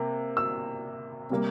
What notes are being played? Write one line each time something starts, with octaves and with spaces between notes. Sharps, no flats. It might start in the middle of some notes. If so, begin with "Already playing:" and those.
Already playing: C3 A#3
E6
C3 G3 A#3